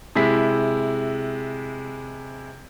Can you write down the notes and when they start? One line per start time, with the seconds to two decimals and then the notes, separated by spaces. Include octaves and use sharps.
0.15 C3 G#3 E4 B6